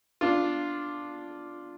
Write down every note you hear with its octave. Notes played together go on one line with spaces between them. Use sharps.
D4 F4